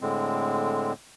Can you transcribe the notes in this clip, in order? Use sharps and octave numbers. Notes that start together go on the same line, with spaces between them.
A2 D3 G#3 C4